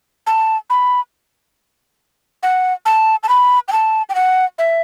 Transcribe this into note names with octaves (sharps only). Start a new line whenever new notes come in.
A5
B5
F#5
A5
A5
B5
G5
A5
G5
F#5
E5